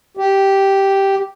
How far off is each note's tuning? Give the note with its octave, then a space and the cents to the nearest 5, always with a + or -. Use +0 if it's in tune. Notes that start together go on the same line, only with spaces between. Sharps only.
G4 -5